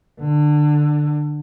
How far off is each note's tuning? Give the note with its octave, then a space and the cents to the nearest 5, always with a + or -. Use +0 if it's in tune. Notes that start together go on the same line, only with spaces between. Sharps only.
D3 +20